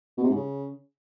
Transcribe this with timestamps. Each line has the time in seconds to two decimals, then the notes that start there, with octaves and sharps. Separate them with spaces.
0.18 B2
0.24 C3
0.30 G#2
0.36 C#3